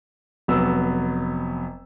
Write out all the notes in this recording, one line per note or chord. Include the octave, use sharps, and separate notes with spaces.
F1 F#3 B3 E6